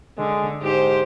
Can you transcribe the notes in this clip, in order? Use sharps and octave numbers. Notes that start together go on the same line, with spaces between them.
D3 G#3
G#2 G4 C5